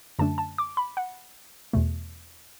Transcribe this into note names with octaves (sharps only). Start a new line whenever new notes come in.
F#2 D3 A3 D4 A5
A5
D6
B5
F#5
E2 B2 A3